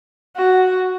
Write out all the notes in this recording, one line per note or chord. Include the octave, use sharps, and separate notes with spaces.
F#4